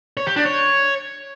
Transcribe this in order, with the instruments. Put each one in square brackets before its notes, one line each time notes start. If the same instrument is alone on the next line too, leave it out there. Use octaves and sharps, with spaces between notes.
[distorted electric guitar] C#5
G4
D4
C#5